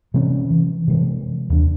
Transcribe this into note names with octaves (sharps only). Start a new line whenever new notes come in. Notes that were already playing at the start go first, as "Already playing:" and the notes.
C3 E3 G#3 C#4
E3
C3 E3 G#3
D#2 D4